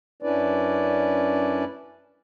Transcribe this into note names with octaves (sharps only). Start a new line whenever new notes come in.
F#2 C#4 D4 E4 B4 D5